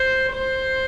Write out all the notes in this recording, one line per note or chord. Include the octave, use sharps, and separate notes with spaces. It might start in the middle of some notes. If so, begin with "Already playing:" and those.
Already playing: C5
C5